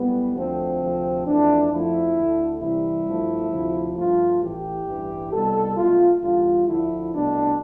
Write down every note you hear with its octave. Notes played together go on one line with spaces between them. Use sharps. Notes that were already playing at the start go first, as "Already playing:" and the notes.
Already playing: B1 A2 G3 B3
D2 D3 F3 A3 C4
D2 C3 F3 A3
F2 E3 A3 D4
F2 D3 F3 A3 E4
D2 D3 A3
C2 C3 E3 G3 E4
G2 F3 A3
D2 C3 F3
G2 F3 A3 F4
A1 A2 E3 G4
A1 G2 E3 G3
C2 B2 G3 A4
B1 B2 A3 F4
E2 D3 G3 F4
D2 D3 F3 E4
C2 B2 A3 D4